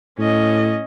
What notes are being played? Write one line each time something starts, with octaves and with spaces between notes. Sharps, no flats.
A2 C#4 D#5